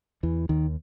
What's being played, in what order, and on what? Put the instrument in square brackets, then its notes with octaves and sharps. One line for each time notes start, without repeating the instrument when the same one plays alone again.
[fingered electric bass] E2 E3
D#2 D#3